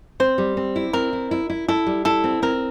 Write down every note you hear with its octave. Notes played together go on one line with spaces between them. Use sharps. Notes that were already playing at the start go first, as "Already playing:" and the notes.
C4 C5
G3
C4
E4
C4 A#4
E4
E4
E4
E4 A4
G3
E4 A4
C4
C4 A#4